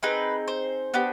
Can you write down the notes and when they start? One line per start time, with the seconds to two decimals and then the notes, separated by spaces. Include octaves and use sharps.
0.03 C4 D#4 G#4 B4
0.48 C5
0.94 B3 D4 G4